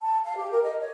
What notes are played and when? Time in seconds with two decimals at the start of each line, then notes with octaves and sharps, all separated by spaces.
0.02 A5
0.25 F5
0.36 G4
0.51 A#4
0.63 D#5
0.80 C#5